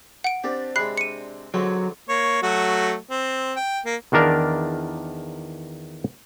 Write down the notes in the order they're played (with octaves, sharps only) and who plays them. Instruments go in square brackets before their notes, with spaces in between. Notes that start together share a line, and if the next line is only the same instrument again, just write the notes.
[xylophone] F#5 D7
[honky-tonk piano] C4 D4 A6 [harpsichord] G4
[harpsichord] C3 G#3 [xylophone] B5 F#6 C7
[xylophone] C#7 D#7
[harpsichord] C#2 D3 C4 [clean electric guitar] F#3
[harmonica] A#3 C#5
F#3 A3 F#4
C4
G5
A#3
[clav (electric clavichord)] E2 D#3 D4 A#4 D5 F5